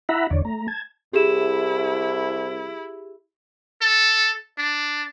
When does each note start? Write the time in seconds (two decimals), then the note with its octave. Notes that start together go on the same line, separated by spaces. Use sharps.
0.09 E4 E5 F#5 A#5 B5
0.30 E2 D3 C#5 D5
0.45 A3 A#5
0.68 A5 G#6
1.13 C2 E4 G4 G#4 E7
3.82 A4
4.58 D4